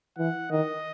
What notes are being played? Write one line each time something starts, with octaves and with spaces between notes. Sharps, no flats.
E3 F#5
D#3 D#5